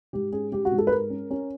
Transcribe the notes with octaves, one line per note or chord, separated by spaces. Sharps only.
G#2 G4
C#4 G#4
G#2 G4
F#4
G#2
A4
B4
G#3 A#4
C#4
C#4